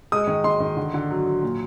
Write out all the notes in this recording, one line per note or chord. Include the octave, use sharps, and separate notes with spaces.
G#3 D#6
D#3
D#3 C6
D#3
D3
D3
F#3
F#3
A#2